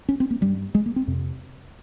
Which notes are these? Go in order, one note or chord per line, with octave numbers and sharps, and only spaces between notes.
C#4
C4
A#3
G2 G3
G#3
A#3
C4
F2 C3